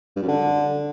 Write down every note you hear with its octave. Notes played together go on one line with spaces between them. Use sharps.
G2
F#2
D3